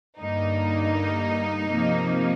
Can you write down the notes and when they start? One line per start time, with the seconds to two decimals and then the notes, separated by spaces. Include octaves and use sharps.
0.18 G2 D3 G3 A#3 D#4
1.68 C3 F3 A#3